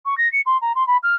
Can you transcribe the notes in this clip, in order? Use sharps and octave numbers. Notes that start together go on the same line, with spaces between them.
C#6
A#6
C#7
C6
A#5
C6
B5
F6